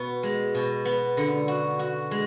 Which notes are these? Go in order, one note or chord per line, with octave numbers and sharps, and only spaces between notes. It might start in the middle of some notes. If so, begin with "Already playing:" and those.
Already playing: B2 B3
G#3
B2
B3
D3
F#4
F#4
G#3